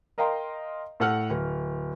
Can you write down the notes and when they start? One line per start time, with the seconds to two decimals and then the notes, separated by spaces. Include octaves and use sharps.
0.18 A#4 D#5 F5 G5 A#5 C6
1.00 A2 A4 F#5 F6
1.30 D1